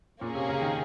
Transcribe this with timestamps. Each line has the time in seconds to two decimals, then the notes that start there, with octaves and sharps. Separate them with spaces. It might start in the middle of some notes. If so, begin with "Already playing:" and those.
0.21 A#2 A#3 C#4 G#4
0.35 C3
0.49 C#3
0.62 D#3